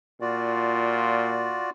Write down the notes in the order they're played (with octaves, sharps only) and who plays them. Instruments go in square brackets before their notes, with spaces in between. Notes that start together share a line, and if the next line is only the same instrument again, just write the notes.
[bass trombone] A#2 [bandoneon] F4 F#4 D5